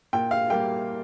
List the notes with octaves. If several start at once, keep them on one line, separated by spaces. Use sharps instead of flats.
A#2 G5
F5
G3 A#3 G5